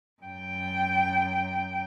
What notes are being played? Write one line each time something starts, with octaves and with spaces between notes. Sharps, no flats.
F#2 G5